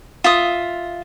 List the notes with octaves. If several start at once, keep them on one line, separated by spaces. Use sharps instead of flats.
F4 E5 D#6